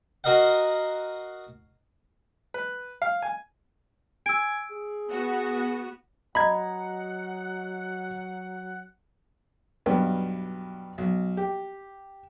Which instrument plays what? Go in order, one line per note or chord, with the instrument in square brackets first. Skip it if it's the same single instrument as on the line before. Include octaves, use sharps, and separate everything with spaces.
[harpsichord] F#4 A#4 D#5 F5 F#5
[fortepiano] B4
F5
G#5
[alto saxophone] G#5 [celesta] E6 D7
[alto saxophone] G#4
[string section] B3 F#4
[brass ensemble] F#3 F#5 [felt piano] D#5 A#5 [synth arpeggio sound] B5 G#6
[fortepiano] B1 G2 B3
B1
G4